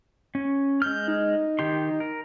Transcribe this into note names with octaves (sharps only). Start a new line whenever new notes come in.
C#4
G#3 F6 G6
D#4
D#3 G4 C6
A#4